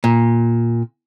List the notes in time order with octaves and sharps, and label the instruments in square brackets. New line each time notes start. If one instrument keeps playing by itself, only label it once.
[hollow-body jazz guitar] A#2